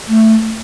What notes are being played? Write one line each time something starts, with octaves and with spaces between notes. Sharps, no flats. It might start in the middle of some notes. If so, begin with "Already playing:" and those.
A3